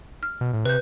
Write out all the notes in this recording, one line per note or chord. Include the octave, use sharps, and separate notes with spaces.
F6
B2
A2
C3 B4 G6